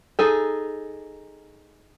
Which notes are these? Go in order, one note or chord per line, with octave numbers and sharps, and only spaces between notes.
D#4 G#4 A4